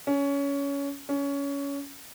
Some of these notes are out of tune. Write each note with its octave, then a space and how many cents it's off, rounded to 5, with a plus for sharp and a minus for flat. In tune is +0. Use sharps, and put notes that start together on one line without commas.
C#4 +20
C#4 +20